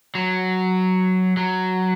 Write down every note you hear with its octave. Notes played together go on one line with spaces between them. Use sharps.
F#3
F#3